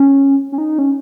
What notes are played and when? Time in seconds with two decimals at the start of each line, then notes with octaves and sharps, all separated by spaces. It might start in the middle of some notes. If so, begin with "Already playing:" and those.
Already playing: C#4
0.52 C#4
0.58 D#4
0.79 C#4